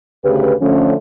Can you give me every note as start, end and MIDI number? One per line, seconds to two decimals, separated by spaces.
0.24 0.52 38
0.24 0.52 49
0.24 0.52 67
0.24 0.52 71
0.61 0.93 50
0.61 0.93 53
0.61 0.93 57
0.61 0.93 61